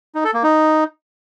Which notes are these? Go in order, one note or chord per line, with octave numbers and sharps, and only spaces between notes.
D#4
A4
A#3
D#4